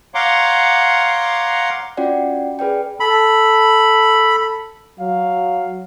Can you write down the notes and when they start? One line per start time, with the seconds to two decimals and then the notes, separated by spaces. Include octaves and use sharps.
0.15 C#5 F5 F#5 A#5 C6 D6
1.97 C#4 F4 F#4 D5 F#5 G5
2.59 G#4 B4 D5 G5
3.00 A4 B5
4.99 F#3 F5